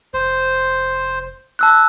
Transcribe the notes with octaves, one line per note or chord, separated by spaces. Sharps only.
F1 C5
A5 E6 F#6